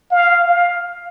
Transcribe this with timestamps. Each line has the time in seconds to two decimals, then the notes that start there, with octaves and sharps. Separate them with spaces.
0.11 F5
0.48 F5